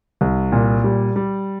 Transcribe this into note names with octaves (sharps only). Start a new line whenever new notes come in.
C2
A#2
G3
G3